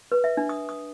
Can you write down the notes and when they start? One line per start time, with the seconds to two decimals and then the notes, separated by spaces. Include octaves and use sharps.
0.12 B4
0.24 E5
0.37 D4
0.49 D#6
0.69 D#6